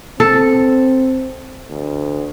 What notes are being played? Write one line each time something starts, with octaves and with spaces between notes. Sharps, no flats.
C4 A4
D2